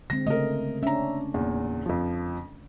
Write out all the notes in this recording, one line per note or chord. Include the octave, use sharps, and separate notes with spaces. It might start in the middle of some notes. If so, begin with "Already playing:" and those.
D3 G#3 C4 A#6
C#3 A3 A#4 D#5
C#4 D4 E5 A#5
E2 A#2
F2 F3